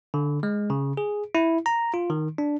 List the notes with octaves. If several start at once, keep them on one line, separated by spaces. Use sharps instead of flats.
D3
G#3
C#3
G#4
E4
A#5
F4
D#3
D4